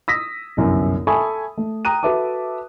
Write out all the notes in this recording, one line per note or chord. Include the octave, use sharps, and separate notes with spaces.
D#6 E6 A#6 B6
G1 C2 F#2
A4 E5 G#5 B5 C#6 D#6
A3
G5 A#5 D#6 F#6 D#7
F#4 A4 B4 E5 A5 D6